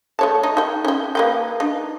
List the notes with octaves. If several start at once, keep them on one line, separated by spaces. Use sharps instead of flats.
A3 C#5 A5
D#4
D#4 G5
C#4 G5
A#3 B4 G5
D4 D#4